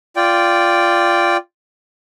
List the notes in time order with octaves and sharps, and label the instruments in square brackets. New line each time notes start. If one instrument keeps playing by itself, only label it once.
[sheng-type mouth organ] F4 D5 G5